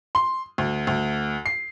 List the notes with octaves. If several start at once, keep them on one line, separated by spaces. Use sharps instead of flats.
C6
D2
D2
C7